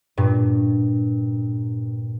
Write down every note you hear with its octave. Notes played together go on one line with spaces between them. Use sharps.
G2 A#2